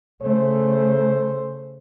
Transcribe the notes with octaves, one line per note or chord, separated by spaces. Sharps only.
C#3 A3 C5